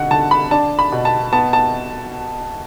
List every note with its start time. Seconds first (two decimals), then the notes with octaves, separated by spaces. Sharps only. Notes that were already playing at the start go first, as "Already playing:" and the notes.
Already playing: B2 D3 F#5
0.11 D3 A5
0.31 B5
0.51 D4 A5
0.79 B5
0.92 B2
1.05 A5
1.33 B3 A5
1.53 A5